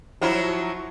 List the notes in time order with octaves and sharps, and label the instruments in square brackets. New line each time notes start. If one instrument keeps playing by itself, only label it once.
[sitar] F3 F#3 E4